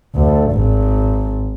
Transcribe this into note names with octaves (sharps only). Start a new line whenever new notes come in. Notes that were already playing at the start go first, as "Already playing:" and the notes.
D2
G#1